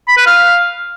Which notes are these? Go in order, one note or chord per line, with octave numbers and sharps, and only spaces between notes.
B5
B4
F5